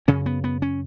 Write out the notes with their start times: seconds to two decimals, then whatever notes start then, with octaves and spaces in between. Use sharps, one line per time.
0.08 F#2 C#3 C#4
0.26 B3
0.44 B3
0.62 C#4